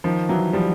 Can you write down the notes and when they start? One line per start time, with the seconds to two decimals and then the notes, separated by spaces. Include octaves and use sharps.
0.04 D#3 F3
0.29 E3 F#3
0.53 F3 G3